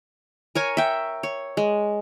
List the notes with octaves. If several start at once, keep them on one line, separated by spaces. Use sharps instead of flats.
A#4 C#5 G#5
E5 G5
C#5
G#3